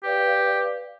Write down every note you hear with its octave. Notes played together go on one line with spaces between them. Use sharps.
G4 B4 D5 F5